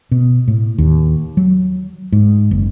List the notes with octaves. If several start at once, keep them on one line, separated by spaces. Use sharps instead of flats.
B2
A2
D#2
F#3
G#2
F#1